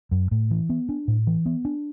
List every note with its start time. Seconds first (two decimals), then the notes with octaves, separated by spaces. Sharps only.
0.11 F#2
0.31 A2
0.51 E3
0.69 B3
0.89 D4
1.08 A2
1.27 E3
1.46 B3
1.65 D4